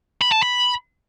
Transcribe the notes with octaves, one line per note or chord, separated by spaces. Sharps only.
B5
A5
B5